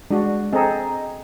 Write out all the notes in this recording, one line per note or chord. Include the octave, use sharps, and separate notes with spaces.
G#3 D4 F#4
C4 G#4 A4 D#5 A#5